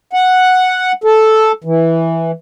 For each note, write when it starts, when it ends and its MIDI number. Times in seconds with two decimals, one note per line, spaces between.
0.13 0.92 78
1.04 1.52 69
1.64 2.31 52